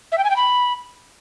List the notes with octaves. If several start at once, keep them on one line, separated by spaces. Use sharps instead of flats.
E5
G5
G#5
G5
B5